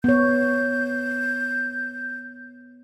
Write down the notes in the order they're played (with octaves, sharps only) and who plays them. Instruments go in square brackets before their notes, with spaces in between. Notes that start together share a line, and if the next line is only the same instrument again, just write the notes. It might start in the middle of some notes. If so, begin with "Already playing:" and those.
[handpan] B3 C#5 [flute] G6